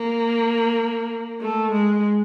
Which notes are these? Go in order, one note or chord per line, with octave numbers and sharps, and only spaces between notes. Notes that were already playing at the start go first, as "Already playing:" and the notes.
Already playing: A#3
A3
G#3